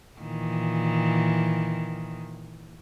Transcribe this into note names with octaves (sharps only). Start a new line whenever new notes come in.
A#2 D#3 E3